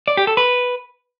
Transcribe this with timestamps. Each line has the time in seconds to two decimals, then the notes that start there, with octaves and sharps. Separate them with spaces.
0.08 D5
0.17 G4
0.27 A4
0.37 B4